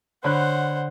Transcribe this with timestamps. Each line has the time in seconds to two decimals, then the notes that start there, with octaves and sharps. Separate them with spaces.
0.24 D3 C5 C#5 F#5 B5 F#6